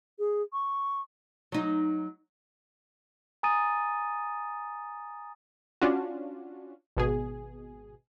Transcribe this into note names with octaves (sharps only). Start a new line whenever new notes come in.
G#4
C#6
F#3 D#4
G#5 A#5 D#6 A6 D#7
C#4 D4 F4 F#4
G#1 B2 G#4